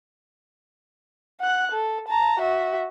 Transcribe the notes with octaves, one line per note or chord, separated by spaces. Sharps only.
F#5 F#6
A4
A5 A#5
F#4 E5